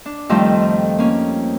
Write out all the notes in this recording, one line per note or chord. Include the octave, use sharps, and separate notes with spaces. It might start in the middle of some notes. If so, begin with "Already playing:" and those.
D4
F2 D#3 F3 G3 A3
A#3 C#4